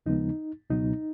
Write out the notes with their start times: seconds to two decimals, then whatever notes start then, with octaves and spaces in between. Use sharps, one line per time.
0.06 D#2 C#3 F3 G#3 B3 D#4
0.70 C#2 B2 F#3 B3 D#4